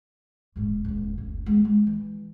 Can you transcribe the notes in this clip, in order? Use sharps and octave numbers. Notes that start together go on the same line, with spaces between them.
D#1 G#2
D#1 C#2
F#1 D2
G#3 B3
G#3
E3